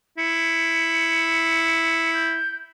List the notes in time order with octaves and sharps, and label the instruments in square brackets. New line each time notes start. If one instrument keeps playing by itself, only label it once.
[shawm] E4 [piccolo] C#7
[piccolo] G6